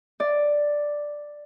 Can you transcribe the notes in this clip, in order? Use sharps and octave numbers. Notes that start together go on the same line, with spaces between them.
D5